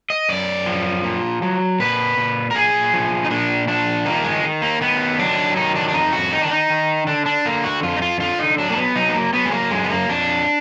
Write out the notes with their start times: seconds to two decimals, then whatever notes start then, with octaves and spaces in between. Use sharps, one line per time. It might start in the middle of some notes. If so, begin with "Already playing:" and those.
0.10 D#5
0.29 F#2 D5
0.66 F3
1.04 A#2
1.42 F#3
1.80 A#2 B4
2.17 A#2
2.51 A#4
2.55 A#2 G#4
2.93 F3
3.25 D#4
3.31 A#2 D4
3.68 F3 D4
4.05 D#3 A#3
4.24 G#3
4.44 D#3
4.62 A#3
4.81 D#3 B3
5.19 F#3 D4
5.56 D#3 D#4
5.75 D4
5.89 D4
5.94 F2 D#4
6.13 F#4
6.32 D#3 D#4
6.41 D4
6.51 D#4
6.70 D#3
7.07 D3 D4
7.26 D4
7.45 D3 A#3
7.64 F#4
7.82 F2 F4
7.97 D#4
8.02 F4
8.20 D3 F4
8.39 D#4
8.58 F#3 D4
8.70 A#3
8.77 B3
8.95 F#3 D#4
9.09 B3
9.15 A#3
9.33 F#3 B3
9.45 G#3
9.52 A#3
9.71 F#2 G#3
9.84 B3
9.90 A#3
10.09 F2 D4